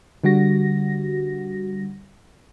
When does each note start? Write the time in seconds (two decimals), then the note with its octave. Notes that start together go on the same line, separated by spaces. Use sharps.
0.24 D3 G3 F#4 A#6